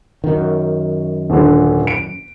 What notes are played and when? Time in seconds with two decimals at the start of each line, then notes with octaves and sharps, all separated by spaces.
0.24 F#2 D#3
1.30 D#1 D3
1.87 D7